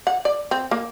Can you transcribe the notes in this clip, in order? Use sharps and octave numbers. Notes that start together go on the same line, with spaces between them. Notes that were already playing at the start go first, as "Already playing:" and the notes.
F#5
D5
C4
A#3